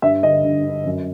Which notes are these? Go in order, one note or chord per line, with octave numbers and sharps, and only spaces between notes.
G2 E5
D3 D#5
G2
D3
F#2